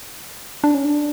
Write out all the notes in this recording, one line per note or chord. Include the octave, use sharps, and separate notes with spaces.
D4
C#4
D4